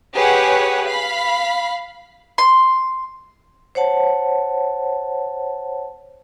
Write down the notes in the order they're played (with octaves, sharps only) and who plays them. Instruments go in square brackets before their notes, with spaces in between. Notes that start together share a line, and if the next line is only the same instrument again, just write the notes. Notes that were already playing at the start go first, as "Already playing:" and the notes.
[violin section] G4 G#4 B4 C#5 F#5
F5 B5
[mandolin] C6
[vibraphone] C5 C#5 F#5 A5